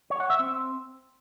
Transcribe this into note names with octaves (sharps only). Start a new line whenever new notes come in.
C#5
F#5
E5
C4